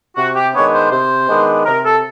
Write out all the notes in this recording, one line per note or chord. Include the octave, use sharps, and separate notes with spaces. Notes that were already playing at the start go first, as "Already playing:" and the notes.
C3 F#4
G4
D#3 G#3 B3 D4 C#5
C5
C3 C5
D#3 G#3 B3 D4
C3 A#4
A4